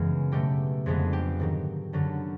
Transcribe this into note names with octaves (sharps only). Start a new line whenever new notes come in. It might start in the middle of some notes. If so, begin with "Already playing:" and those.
Already playing: F#2 C#3 E3 G#3 B3
B2 F#3 A3 G4
F2 D3 F3 G#3 B3 G#4
G4
G#2 D#3 F#3
F#2 D3 F#3